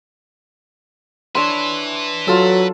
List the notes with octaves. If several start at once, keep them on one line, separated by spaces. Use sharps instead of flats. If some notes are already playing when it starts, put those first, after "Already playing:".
D4 B4 C#5 E5 C6
F#3 F4 A4